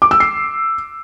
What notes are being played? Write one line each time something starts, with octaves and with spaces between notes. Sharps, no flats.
D6
E6
C7